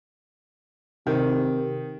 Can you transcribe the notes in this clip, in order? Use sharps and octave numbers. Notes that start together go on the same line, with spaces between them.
C3 D#3